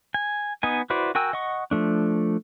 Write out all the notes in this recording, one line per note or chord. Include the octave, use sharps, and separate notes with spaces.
G#5
B3 D#4 D#5 G#5
E4 F#4 B4 C5 D5
F#4 A#4 G5 G#5 E6
D#5 F#5 C#6
F3 A3 D4